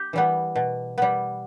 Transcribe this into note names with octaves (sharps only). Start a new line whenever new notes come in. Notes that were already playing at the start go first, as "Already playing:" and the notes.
Already playing: G4
E3 G3 B3
B2
G3 B3